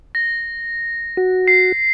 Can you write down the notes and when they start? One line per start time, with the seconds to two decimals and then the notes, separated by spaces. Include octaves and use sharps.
0.15 A#6
1.17 F#4
1.48 C7